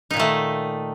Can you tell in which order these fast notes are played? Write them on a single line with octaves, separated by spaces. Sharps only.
D#4 A#2 D#3 A3